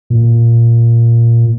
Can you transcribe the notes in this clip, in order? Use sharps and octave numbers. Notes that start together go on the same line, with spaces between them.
A#2